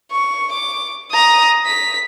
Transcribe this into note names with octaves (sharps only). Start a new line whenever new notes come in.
C#6
D6
A#5 D#6
B6